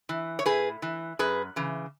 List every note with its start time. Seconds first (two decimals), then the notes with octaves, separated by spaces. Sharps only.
0.09 E3
0.39 C#5
0.46 A2 G#4 B4
0.82 E3
1.19 F#2 G#4 B4
1.56 C#3 E3